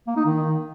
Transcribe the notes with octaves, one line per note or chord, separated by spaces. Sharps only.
A#3
D#4
D#3